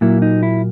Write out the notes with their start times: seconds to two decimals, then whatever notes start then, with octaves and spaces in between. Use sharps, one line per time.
0.01 A#2 F#3 A#3 E4
0.22 D#4
0.43 E4